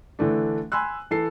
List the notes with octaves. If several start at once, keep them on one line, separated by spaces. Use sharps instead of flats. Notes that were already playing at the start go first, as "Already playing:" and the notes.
D3 E3 A3 D4
G#5 B5 C6 E6 F#6
E3 A4 C7